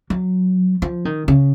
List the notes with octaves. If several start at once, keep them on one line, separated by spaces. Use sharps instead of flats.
F#3
F3
D#3
C#3